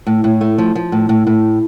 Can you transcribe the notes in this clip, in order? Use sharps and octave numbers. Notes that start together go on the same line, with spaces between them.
A2
A2
A3
F3
F3
A2
A2
A2